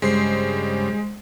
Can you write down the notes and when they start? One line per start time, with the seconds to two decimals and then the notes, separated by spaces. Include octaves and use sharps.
0.02 G2 C#3 G3 G#3 C5 C7